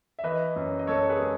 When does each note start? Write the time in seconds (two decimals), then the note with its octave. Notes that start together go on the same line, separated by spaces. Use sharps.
0.19 E5
0.23 E3 B4 D#5
0.56 F#2
0.79 D#5
0.87 F#2 A4 C#5
1.09 G#4 B4
1.20 G#3